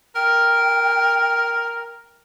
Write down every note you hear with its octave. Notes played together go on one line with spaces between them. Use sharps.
A#4 G5